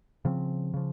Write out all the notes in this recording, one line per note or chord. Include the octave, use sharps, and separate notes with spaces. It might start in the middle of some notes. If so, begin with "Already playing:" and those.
C#3 F3 C4
C#3 F3